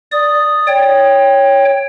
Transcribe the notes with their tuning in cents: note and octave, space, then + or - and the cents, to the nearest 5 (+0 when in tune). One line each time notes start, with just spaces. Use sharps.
D5 +0 D#6 +0
C#5 +0 G5 +15